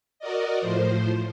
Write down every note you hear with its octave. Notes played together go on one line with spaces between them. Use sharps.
F#4 A#4 D5 D#5
A2 F3 C5